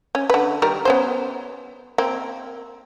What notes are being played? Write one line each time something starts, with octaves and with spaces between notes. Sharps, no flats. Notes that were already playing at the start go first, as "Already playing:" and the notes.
C#4
D3 B4
D#3 G3 A#4
B3 C#4 C5
A#3 C4